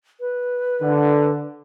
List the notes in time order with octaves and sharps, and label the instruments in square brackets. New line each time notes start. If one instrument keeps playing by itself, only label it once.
[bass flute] B4
[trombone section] D3